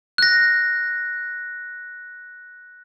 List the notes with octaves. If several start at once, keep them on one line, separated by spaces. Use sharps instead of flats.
F#6 A#6